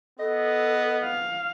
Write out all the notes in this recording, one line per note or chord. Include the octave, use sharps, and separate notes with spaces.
B3 A4 D#5
F5